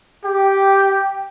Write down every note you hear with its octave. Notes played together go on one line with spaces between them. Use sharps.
G4 G5